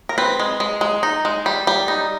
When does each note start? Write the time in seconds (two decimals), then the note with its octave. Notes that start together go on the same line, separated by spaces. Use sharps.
0.09 A#4
0.18 C4 B4
0.40 G#3
0.60 G#3
0.81 G#3
1.03 D#4
1.25 G#3
1.46 G3
1.67 G3
1.88 D#4